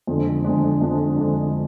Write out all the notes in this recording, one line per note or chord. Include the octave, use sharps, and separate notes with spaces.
F2 D3 G#3 D4
F2 D3 G#3 D4
F2 D3 G#3 D4
F2 D3 G#3 D4